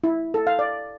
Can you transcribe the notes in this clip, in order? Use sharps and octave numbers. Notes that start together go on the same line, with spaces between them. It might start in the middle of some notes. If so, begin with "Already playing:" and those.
E4
A4
F5
D5